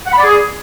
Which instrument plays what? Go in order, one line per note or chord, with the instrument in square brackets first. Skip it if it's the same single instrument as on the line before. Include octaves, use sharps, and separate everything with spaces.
[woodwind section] F#5
B5
D5
G#4